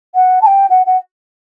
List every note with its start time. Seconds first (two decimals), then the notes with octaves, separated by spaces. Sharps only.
0.15 F#5
0.41 A5
0.46 G5
0.70 F#5
0.86 F#5